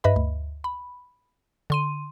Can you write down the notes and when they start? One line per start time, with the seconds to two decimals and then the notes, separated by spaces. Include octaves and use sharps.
0.04 G2 B4 D#5 E5 B5
0.16 D2
0.64 B5
1.70 D3 C6 D#7